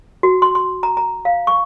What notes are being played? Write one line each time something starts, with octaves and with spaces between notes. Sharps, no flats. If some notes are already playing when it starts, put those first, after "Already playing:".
F#4
C6
C6
A#5
A#5
F5
C#6